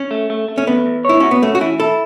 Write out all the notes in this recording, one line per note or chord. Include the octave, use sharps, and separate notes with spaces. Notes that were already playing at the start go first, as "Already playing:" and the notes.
Already playing: C#4
A3
A3
A3
C#4
E2 B3
E2
E4 C#5
C#4 F#4
B3
A3 C#4
F#4
E3 E4
E4 A4